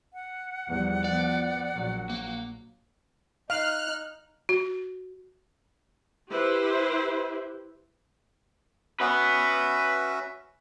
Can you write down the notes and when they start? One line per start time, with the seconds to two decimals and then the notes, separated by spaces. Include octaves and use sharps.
0.13 F#5
0.68 E2 F3 G3
1.04 F3 B3 D5
1.74 A#1 A#2 F#3
2.10 A#3
3.50 D#4 F5 F6 F#6
4.49 F#4
6.31 E4 G4 B4 C5
9.00 C#4 F#4 B4 E5 F#5